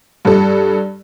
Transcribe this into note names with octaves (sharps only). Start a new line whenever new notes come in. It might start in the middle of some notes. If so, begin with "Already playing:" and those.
G2 A4